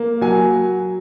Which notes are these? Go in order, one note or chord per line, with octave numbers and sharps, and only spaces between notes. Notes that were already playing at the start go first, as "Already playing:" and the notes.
Already playing: A#3
F#3 G#5